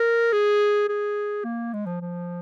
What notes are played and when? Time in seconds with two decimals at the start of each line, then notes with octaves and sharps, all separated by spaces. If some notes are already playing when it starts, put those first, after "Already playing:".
Already playing: A#4
0.33 G#4
0.89 G#4
1.45 A#3
1.73 G#3
1.86 F3
2.01 F3